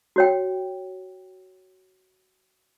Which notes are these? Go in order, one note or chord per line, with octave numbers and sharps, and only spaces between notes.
F#4 C#5 G5